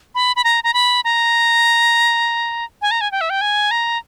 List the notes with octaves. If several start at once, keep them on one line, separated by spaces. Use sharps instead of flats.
B5
B5
A#5
A#5
B5
A#5
G#5
A#5
G#5
G5
E5
G5
G#5
A#5